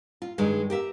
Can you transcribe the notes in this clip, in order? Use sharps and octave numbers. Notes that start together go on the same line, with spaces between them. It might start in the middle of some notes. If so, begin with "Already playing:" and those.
F4
G2 D#3 G#3
G4 A#4 E5